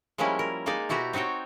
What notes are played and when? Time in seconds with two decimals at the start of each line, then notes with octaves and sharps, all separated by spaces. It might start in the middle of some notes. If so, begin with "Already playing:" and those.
0.18 F3 G3 G#3 A#3 C#4 E4
0.39 A#4
0.66 G#3 A#3 D#4 G#4 D5
0.89 B2 E4 F#4 G4 A#5
1.13 C4 D#4 F#4 C#5 G5